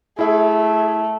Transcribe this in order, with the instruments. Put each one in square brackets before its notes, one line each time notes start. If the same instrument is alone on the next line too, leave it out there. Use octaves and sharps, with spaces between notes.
[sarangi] A3 [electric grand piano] E4 G#4 E5